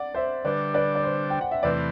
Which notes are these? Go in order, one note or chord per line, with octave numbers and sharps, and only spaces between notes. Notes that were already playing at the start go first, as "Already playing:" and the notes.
Already playing: D5 F#5
C5 E5
D3 G3 D4 B4 D5
B4 D5
D5
C5
G5
F#5
E5
E2 C3 E3 A3 C4 B4 D5